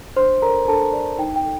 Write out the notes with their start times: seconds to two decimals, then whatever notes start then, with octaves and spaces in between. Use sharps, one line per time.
0.16 D4 C5 C6
0.42 A4 A#4 D5 A#5
0.68 D4 A4 A5
0.93 A4 D5
1.19 D#4 G5
1.36 G5
1.44 A4